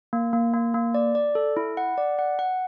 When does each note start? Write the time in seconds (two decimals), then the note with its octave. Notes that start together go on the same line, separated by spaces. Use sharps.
0.13 A#3
0.33 A#3
0.53 A#3
0.74 A#3
0.94 D5
1.15 D5
1.35 A4
1.57 E4
1.77 F#5
1.98 D5
2.19 F#5
2.39 F#5